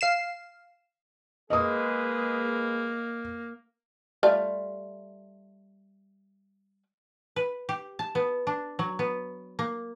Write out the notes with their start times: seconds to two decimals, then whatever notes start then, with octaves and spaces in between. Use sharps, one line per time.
0.01 F5 C7 E7
1.50 G#3 A#3 G#4 B4 D#5 D#6
4.23 G3 A3 F4
7.36 B4
7.69 G4
7.99 A5
8.15 B3
8.47 D4
8.79 F#3
8.99 B3
9.59 A#3